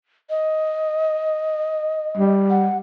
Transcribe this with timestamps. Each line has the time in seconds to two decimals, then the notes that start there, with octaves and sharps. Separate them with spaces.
0.30 D#5
2.17 G3
2.50 F#5